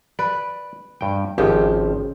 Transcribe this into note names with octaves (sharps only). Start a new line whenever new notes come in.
B4 D5
G2 G5
G#1 C#3 F3 G4